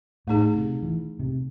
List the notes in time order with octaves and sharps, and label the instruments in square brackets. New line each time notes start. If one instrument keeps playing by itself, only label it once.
[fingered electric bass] A2 [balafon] A3 D#4 G#4
[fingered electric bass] C3
E3
C3